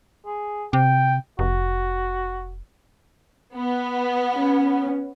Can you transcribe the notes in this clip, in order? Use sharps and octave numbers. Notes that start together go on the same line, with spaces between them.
G#4
C3 G5
F1 F#4
B3
C#4